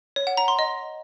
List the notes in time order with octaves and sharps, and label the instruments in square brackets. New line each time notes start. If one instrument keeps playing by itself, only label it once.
[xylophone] C#5
F#5
A#5
C6
D#5